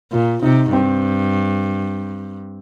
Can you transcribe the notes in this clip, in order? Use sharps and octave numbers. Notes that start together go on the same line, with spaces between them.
A#2 F4
C3 D#4
G2 C4